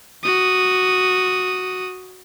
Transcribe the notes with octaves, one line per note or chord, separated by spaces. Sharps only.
F#4 D#6